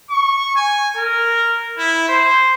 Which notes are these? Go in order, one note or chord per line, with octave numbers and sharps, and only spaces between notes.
C#6
G#5
A#4
E4
C5